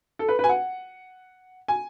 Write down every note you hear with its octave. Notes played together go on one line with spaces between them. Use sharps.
A4
B4
B4
G#5
F#5
G#5